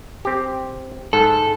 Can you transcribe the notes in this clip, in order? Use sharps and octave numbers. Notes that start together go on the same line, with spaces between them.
C4 G4
G#2 A4